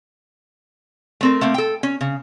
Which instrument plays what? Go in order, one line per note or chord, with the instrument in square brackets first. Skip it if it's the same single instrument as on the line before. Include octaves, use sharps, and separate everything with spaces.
[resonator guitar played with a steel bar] A3 C4 A#4
A3 A#3 C4
A4 G5
C#4
C#3